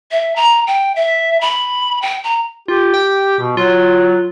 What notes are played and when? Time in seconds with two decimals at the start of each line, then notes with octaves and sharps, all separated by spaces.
0.11 E5
0.36 A#5
0.67 G5
0.96 E5
1.41 B5
2.02 G5
2.24 A#5
2.68 F4 G4
2.94 G5
3.39 B2
3.57 F#3 F4